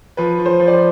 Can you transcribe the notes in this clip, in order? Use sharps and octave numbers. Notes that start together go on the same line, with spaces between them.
F3 B4
F3
C5
F3
D5
C5